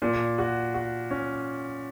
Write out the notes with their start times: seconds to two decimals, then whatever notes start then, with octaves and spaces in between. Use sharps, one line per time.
0.02 A#2
0.38 F#4
0.74 F#4
1.11 C#4